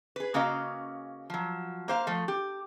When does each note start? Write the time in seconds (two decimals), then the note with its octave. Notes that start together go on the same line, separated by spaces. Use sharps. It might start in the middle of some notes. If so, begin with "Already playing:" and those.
0.16 G#4 B4
0.34 C#3 A#3 C#4 F#4 D#5 F5
1.30 F3 F#3
1.88 A#3 C5 F5
2.07 F3 A3
2.28 G4